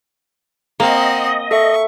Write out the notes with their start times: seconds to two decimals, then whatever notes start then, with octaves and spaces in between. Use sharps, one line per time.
0.80 A#3 C4 D#5 F#5
1.51 A4 E5 C#6